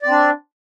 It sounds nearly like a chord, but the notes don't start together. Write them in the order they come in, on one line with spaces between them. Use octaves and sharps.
D5 C4 D4